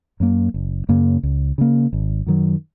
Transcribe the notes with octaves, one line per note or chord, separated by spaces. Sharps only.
F#2 F#3 A#3
F#1
F#2 C#3 A#3
C#2
C#3 A#3
G#1
F#2 D#3 F#3